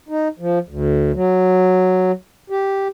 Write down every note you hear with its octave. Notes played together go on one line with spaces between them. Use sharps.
D#4
F3
D2
F#3
G4